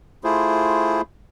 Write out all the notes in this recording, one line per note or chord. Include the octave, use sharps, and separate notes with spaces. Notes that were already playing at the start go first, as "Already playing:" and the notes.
A3 E4 F4 G#4 C5